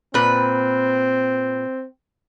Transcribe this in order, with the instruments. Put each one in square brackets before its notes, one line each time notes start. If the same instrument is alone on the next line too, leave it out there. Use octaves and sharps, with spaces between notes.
[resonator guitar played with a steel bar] A#2 B4 [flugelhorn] C4